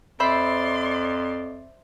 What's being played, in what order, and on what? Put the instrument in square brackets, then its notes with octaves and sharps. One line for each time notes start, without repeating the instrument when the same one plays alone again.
[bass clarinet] F2 [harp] C5 E5 B5 [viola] D5 C6